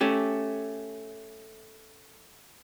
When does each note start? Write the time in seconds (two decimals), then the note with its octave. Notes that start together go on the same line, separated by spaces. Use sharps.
0.01 A3 C#4 G4